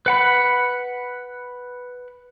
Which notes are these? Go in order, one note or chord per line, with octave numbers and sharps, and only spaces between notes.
B4 F#5 B5